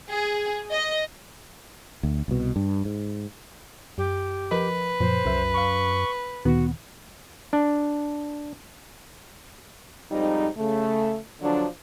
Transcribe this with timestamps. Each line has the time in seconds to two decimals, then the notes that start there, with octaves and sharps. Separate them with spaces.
0.11 G#4
0.71 D#5
2.03 D2
2.28 C2 B2
2.56 G2
2.85 G#2
3.98 F#2 G4
4.51 F3 A#4 B4 D#5
5.00 F#2 A#2 F3 C5
5.25 C2 F#2 E5
5.54 F5 B5 C#6
6.45 D2 A#2 D#3 B3 F#4
7.53 D4
10.10 F2 G#2 G3 D#4
10.58 C#3 A3
11.41 D3 F3 F#3 D4